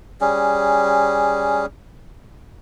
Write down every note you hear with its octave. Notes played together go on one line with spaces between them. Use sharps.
G3 C#4 G#4